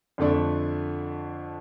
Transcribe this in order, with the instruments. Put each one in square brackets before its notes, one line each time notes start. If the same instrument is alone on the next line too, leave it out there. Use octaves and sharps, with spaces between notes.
[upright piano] F2 D3 A3 D4